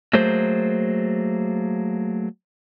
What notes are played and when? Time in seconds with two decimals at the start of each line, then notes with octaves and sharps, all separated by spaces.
0.13 F#3 A3 A#3 G#4 C5